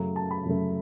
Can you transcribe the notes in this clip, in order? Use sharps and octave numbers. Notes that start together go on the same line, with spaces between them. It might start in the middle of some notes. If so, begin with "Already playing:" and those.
Already playing: F#2 C#3 F#3 A3
A5
B5
F#2 C#3 F#3 A3